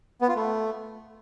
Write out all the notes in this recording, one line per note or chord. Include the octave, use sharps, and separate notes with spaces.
B3
F4
A3